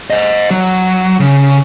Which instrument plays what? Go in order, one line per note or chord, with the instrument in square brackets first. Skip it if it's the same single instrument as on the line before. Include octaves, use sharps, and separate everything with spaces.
[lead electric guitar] C5 D#5
F#3
C#3